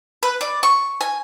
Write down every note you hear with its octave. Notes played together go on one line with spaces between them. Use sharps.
B4
D5
C#6
G#5